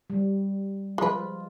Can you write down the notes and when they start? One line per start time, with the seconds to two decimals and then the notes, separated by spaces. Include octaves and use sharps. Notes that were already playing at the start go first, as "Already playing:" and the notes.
0.10 G3
0.98 F3 G#3 F4 B4